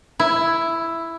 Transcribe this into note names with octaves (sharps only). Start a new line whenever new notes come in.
E4